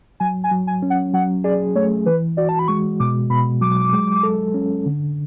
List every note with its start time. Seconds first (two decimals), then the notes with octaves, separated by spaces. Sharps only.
0.20 F#3 G#5
0.44 G#5
0.51 F#3
0.67 G#5
0.82 C#4
0.90 F#5
1.14 F#3 F#5
1.44 G#4 D5
1.75 A3 C#5
2.06 E3 B4
2.37 F#4 D5
2.49 A5
2.59 B5
2.68 G#3 C#6
3.00 B2 D6
3.30 B2 B5
3.61 F#3 D6
3.93 G#3
4.23 A4
4.54 C#4
4.86 D3